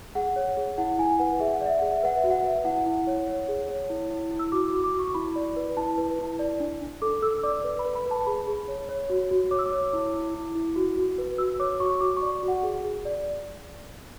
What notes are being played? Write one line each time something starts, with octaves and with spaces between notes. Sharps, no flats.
G#4 F#5
C#5
G#4
E4 F#5
E4 G#5
B4 F#5
G#4 E5
F#5
D5 E5
G#4 F#5
E5
B4 F#5
E5
F#4
F#5
B4 E5
E4 F#5
E4
C#5
C#5
G#4
C#5
E4
E4
E4
E6
F#4 D6
F#4 D6
D6
F#4
C#6
E4 B5
D5
B4
E4 A5
B4
E4
D5
D4
D4
A4 D6
A4 E6
D5 D6
B4
B5
B4
B5
B4 A5
G#4 B5
G#4
C#5
C#5
F#4
F#4
C#5 D6
E6
D6
C#5
E4
E4
E4
E4
F#4
F#4
B4
F#4 E6
C#5 D6
F#4 C#6
F#4 D6
C#6
D5
F#4
F#5
G#4
G#4
D5